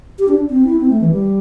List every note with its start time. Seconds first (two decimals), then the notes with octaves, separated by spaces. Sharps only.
0.19 G4
0.28 D4
0.49 C4
0.65 E4
0.80 C4
0.90 A3
1.01 E3
1.10 G3